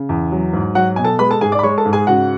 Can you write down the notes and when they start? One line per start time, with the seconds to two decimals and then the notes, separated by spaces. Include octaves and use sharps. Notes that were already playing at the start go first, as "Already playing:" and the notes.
Already playing: C#3
0.09 E2
0.32 F#3
0.53 G#2
0.75 F#3 F#4 F#5
0.96 B2 G#5
1.04 A4 A5
1.19 G#3 B4 B5
1.30 A4 A5
1.41 G#2 G#4 G#5
1.52 D5 D6
1.59 B5
1.63 G#3 C#5 C#6
1.78 A4 A5
1.86 G#2
1.93 G#4 G#5
2.07 C#3 F#4 F#5